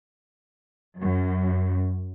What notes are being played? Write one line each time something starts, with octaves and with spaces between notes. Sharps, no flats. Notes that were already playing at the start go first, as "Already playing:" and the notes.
F#2